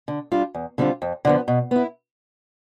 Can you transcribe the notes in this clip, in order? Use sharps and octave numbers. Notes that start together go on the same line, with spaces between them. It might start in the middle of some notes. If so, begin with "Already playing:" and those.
D3
G3 D4 F4
E2
D3 G3 C4 F4
F2
D3 F3 B3
B2
B3 E4